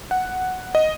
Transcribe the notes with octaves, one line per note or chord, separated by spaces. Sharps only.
F#5
D#5